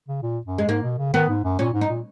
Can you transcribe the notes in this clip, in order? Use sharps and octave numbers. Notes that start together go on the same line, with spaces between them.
C#3
A#2
F#2
G#3
G#2 A#3
B2
C#3
D#3 B3
G#2
F#2
A#2 C#4
G#2
D#4
A#2